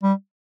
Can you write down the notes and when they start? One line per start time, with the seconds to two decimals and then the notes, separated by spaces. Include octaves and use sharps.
0.03 G3